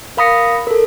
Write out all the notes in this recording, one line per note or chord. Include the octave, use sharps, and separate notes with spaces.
A#4 F5 B5 D#6 A#6 C#7
A4 A#4